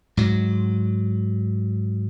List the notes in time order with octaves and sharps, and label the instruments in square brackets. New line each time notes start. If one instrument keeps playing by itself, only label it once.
[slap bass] G#2 F#3